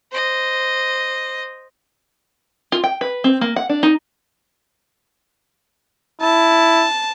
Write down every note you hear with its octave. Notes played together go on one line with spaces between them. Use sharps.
C5 D#5
F4
G5
B4
C4
A#3
F#5
D4
D#4
E4 A5